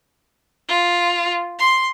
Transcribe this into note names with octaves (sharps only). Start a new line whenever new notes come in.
F4
C6